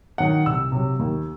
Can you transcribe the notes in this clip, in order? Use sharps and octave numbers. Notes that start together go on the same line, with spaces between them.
D#3 F#3 F#5
C2 E6
C3 F#3
D#2